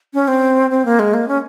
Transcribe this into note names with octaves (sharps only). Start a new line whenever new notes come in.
C#4
C4
C4
A#3
G#3
A#3
C#4